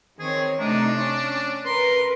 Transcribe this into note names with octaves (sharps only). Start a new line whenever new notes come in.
D#3 C4 G#4 C#5
C3 A3 D4 D#4
C#4
A#4 B4 C6